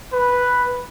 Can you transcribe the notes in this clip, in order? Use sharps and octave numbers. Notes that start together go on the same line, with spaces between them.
B4